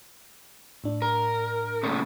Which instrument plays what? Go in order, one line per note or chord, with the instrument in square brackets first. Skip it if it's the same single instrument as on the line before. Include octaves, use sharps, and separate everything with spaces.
[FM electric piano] A2 D4
[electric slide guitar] A#4
A#2 C#3 A3